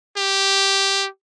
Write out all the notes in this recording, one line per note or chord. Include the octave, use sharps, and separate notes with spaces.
G4